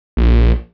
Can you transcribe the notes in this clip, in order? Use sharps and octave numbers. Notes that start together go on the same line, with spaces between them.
A#1